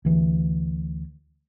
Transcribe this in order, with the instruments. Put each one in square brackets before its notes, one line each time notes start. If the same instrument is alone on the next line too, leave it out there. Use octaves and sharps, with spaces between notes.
[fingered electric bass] D2 E3